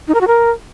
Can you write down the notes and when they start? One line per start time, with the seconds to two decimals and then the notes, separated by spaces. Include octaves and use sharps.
0.08 D#4
0.14 A#4
0.21 F#4
0.27 A#4